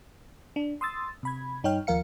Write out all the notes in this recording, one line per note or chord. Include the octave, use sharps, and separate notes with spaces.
D4
C6 D#6 E6 A6
C3 B5 G#6
G2 D#4 C#5 G5 F6
D#2 F3 A#4 F5 C#7